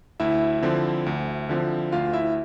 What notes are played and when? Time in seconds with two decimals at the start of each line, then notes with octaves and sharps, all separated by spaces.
0.20 D2 E4 E5
0.62 D3 F3 C4
1.06 D2
1.49 D3 F3 C4
1.92 D2 F4 F5
2.13 E4 E5